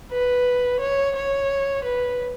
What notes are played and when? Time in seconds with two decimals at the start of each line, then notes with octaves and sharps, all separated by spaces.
0.11 B4
0.80 C#5
1.15 C#5
1.84 B4